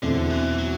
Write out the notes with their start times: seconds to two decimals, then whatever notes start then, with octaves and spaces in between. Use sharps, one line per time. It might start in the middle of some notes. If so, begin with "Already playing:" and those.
0.02 E2 B2 D3 A3 C4 E4
0.30 E3
0.58 F#3